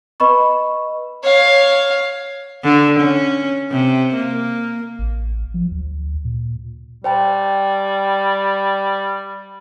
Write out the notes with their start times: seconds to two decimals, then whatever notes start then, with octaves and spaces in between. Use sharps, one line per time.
0.20 B4 D#5 B5 C#6
1.24 C#5 F5
2.64 D3
3.00 C#4
3.71 C3
4.15 A#3
4.99 A1
5.54 F3
5.71 D2
6.25 A#2
7.04 G3 C5 G5 A5